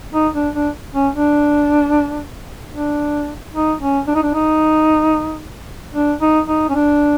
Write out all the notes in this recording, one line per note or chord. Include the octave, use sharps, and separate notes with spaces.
D#4
D4
D4
C#4
D4
D4
D#4
C#4
D4
D#4
D4
D#4
D4
D#4
D#4
C#4
D4